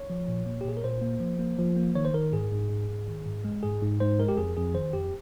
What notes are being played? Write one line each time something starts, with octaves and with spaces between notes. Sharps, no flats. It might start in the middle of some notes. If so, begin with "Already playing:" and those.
Already playing: C#5
F3
A#2
A#3
G4
A#2 G#4
A#4
A#2 C5
A#3
F3
A#3
F3
A#3
D#3 C#5
C5
D#3 A#4
G#2 G#4
G#2
G#2
G#2
D#3
G#2
G#3
G#2 G#4
G#2
G#2 C5
G#3 A#4
G4
F2 G#4
F2 G#4
D#3 C5
F2 G4